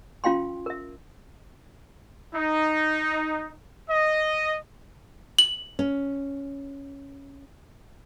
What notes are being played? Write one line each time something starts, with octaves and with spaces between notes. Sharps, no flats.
C#4 F4 F5 G5 C6
A#4 E5
D#4
D#5
F#7
C#4